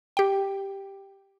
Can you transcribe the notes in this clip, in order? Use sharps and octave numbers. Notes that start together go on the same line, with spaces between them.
G4 G5